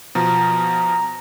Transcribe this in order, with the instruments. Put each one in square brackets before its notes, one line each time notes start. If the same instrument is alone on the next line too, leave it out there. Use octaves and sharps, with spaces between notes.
[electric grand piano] B2 F3 [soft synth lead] A#5